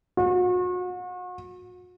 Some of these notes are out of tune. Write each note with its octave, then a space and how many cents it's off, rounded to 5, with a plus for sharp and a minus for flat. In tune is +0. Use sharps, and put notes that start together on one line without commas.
F#4 -40